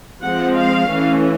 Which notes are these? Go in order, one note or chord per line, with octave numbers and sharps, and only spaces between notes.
F3 G#3 C4 F#5
F5
E3 A3 C#4